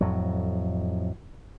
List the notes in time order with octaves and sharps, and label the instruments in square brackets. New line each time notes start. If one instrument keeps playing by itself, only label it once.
[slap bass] F2 A2 F#3